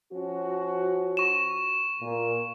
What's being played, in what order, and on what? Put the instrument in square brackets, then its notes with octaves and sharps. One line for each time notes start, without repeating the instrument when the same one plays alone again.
[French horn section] F3 C#4 F#4
[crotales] C#6 E7
[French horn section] A#2